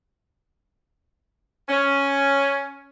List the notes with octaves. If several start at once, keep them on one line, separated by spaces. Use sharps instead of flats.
C#4